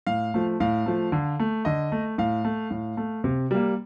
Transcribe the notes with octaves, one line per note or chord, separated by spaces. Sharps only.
A2 F5
F3 A3
A2 F5
F3 A3
D3
A3
D3 D#5
A3
A2 F5
A3
A2
A3
C3
G3 A#3